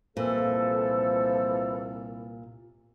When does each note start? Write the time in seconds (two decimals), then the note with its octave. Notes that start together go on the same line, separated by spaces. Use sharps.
0.17 C2 A#2 E3 F3 A#3 A4